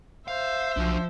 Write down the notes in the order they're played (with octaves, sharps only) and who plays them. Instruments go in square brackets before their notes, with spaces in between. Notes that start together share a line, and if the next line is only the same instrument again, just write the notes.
[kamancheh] C5 E5 [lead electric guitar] F5
[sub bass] B1 [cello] F3 [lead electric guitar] D4 F#4